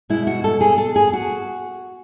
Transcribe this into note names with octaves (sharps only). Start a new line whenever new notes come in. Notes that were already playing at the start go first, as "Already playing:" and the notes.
B2 G#3 E4
F#4
A4
G#4
A4
G#4
F#4